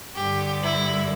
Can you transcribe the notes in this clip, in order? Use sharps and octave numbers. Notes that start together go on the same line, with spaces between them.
G2 D3 G4
E4